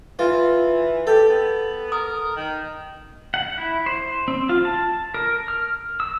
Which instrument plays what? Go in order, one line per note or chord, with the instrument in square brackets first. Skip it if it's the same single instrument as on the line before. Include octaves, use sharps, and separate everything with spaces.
[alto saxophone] E3 [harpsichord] F4 [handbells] B4
[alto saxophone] G4 [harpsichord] A4
[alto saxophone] B3
[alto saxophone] A#4 [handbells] D#6
[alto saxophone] D#3
[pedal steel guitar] F#5
E4
C5
C4
F4
A5
A#4
F6
E6